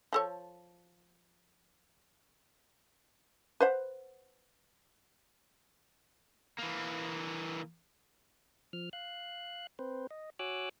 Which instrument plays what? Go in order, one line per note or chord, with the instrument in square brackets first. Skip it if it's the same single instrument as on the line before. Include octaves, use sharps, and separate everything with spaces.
[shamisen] F3 A4 C#5
B4 C5 F#5
[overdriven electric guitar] E3 A#3
[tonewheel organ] F3 F6
F5 F#6
C4 B4 C5
D#5
F#4 C#5 G#5 D6 E6 F#6